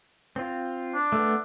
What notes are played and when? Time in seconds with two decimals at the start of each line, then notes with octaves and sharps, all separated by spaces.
0.36 C4 F4
0.94 D4
1.12 A3 B3